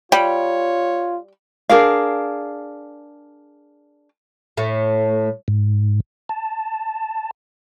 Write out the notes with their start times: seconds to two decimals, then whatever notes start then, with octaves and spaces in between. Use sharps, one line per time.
0.12 G3 F4 C#5 G5
1.69 D4 G#4 A#4 F5
4.57 A2 A3
5.48 G#2
6.29 A5